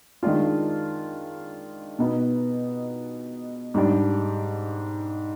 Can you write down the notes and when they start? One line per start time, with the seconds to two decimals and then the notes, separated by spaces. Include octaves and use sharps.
0.23 D#3 G#3 D4 F4
1.99 B2 B3 D#4
3.74 G#2 G3 D4